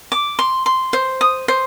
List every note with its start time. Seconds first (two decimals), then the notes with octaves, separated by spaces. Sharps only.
0.12 D6
0.39 C6
0.66 C6
0.93 C5
1.21 D#6
1.48 C5